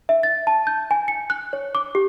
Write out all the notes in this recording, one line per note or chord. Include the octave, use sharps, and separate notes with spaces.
E5
A6
A5
G6
G#5
C#7
F#6
C#5
D6
G4